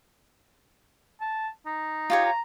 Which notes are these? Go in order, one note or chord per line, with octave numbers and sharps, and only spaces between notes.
A5
D#4
F4 G4 C#5
A#5